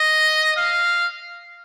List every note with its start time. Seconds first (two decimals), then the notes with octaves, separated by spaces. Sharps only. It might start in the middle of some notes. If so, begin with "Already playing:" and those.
Already playing: D#5
0.57 F5